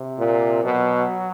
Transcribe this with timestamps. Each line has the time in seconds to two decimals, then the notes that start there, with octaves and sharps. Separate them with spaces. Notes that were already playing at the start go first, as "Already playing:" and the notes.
Already playing: C3
0.18 A#2
0.64 B2 F#3